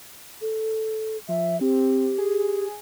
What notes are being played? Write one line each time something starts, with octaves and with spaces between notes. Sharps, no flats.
A4
F3 E5
C4 G4
G#4